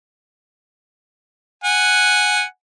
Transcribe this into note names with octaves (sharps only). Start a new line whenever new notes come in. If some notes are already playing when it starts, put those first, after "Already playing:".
F#5 G#5